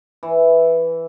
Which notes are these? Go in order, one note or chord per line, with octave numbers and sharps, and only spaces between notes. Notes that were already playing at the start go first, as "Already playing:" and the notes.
E3